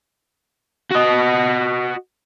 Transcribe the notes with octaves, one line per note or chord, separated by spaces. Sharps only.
F#4 D#5